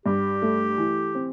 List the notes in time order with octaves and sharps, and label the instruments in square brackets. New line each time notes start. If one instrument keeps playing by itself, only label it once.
[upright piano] G2 [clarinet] G4
[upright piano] A3
E3
C4